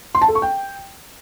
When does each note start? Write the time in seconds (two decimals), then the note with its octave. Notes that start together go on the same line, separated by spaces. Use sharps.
0.15 C6
0.21 A5
0.28 A4
0.35 C#6
0.42 G5